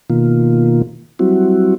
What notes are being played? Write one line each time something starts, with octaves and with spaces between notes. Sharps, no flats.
B2 D#3 A#3 F4
F#3 G3 C4 E4 F#4